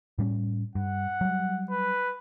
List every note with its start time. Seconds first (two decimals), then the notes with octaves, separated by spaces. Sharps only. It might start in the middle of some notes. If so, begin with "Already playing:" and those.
0.18 A2 G3 C#4
0.75 G2 F#5
1.21 F#3 G3
1.70 B4